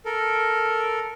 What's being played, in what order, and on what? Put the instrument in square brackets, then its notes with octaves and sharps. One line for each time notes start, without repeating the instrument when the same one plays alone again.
[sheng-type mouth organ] A4 A#4